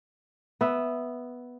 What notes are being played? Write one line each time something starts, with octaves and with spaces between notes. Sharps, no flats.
B3 E5